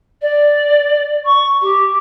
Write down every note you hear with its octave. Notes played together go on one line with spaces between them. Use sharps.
D5
C#6
G4